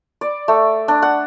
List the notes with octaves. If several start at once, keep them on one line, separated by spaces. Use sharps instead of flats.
D5
A3
D4
F#5